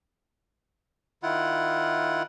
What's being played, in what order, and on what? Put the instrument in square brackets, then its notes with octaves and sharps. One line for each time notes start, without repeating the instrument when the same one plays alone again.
[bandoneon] D#3 E4 F4 F#5